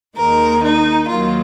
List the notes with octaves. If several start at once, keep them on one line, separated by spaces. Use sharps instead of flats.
D#2 D#3 G#3 A#4
D#4
D#2 D#3 F#3 F4